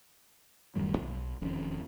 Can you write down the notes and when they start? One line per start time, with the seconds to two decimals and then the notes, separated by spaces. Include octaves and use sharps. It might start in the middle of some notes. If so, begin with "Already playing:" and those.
0.76 D1 F#2 D#3 G3
0.98 B1
1.41 E1 F2 D#3 C#4